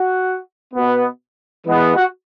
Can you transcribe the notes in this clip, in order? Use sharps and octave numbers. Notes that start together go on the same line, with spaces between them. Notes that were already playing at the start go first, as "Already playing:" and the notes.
Already playing: F#4
B2 B3
E3 G#3 B3
F#4